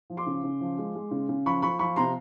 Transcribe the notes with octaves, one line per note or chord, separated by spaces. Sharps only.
F3
C6 D6
C#3
C#3
F3
G#3
G#3
C#3
C#3
F3 B5 C#6
F3 B5 C#6
F3 B5 C#6
C3 A#5 C6